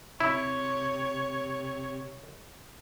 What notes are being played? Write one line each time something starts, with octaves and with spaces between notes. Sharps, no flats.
C3 E4 C#5